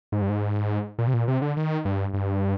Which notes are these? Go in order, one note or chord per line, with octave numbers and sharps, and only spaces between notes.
G#2
G2
G#2
A#2
C3
A#2
C3
D3
D#3
G2
G2